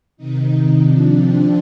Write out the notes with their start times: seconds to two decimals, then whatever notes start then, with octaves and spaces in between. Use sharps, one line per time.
0.17 C3 D#3 D#4
0.81 C3 F3 D4
1.13 C4